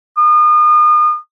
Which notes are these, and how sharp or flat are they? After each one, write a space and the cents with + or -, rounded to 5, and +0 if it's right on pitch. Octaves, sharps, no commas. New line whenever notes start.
D#6 -35